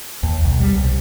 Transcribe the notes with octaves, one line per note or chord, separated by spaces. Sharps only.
D#2
B1
G3
C2